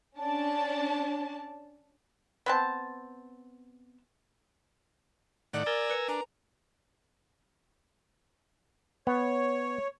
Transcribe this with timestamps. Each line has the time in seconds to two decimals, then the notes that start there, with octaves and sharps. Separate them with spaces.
0.17 C#4 D4 A5
2.46 B3 C4 A5
5.54 A2 D#3 D5 F#5
5.66 A#4 G#5 A#5 E6 A6
5.90 B4 C#7
6.08 D4 G#5 A#5
9.07 B3 C#5